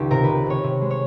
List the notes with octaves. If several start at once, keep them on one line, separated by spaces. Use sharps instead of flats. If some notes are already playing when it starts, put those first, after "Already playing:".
Already playing: C#2 D#3 G4
C3 A#4
C3 B4
C3 C#5
C3
G#3
C#5